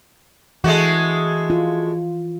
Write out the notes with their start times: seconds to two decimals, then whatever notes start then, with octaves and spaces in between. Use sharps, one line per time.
0.64 E3 G#3 A3 F#4
1.50 F4